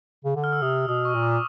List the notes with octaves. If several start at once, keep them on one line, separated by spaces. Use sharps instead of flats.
C#3
D3
F6
E6
C3 D#6
B2 D#6
C#6
A#2
D6